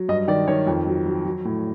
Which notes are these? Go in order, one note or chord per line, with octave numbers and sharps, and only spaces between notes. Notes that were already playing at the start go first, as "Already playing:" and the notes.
Already playing: F#3
G2 D#5
D#3 D5
D#3 C#5
F2
F#3
F#3
F#3
A2